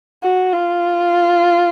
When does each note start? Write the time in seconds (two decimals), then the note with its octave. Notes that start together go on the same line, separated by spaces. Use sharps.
0.23 F#4
0.52 F4